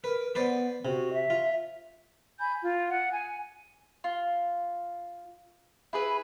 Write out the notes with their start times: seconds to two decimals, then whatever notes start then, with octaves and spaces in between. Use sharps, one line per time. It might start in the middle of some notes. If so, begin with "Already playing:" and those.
0.04 A#4 B4
0.35 B3 B4 C5 D5
0.85 C3 F#4
1.13 E5
1.30 F4
2.39 G#5 B5 G6
2.61 F4
2.88 F#5
3.12 G#5
4.04 F4
5.93 E4 G#4 B4